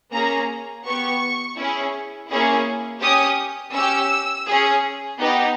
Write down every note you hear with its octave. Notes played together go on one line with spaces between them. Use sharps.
A#3 C#4 G#4 A#5
B3 G4 C#6
C#4 E4 G#4
A#3 C#4 E4 G#4
C#4 G4 D#6
C#4 G4 E6
C#4 G#4
B3 D#4 G4